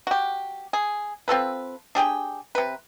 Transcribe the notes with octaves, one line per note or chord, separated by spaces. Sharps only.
F#4 G4
G#4
C4 F4 A4 B4
D4 G4 G#4 G5
C3 B4